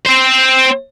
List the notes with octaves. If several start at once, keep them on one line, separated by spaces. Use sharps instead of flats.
C4 C5